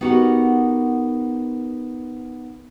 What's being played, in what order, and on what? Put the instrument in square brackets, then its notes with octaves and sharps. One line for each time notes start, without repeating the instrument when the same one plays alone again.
[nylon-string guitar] B3 D#4 F#4 G4 A#4 F#5